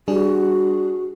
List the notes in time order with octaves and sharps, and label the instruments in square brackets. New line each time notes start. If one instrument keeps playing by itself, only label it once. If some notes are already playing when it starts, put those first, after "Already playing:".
[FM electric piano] G3 D4 G#4 [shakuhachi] F#4